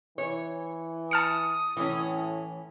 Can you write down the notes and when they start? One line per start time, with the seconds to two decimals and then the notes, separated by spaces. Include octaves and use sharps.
0.18 E3 C#5
1.11 A5 D#6 F6 C#7
1.77 A2 E3 C#4